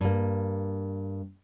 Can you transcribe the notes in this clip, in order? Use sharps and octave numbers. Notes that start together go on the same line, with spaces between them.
G2 A#3